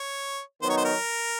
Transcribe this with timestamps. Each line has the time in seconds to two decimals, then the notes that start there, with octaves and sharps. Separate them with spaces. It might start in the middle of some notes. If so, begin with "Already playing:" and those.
Already playing: C#5
0.62 D#3 F#3 B3 D#4 C5
0.70 C#5
0.77 C5
0.85 A#4